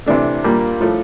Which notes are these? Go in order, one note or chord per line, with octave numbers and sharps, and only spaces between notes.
C3 E3 A3 D4
A#2 G3 A#3
A2 F3 A3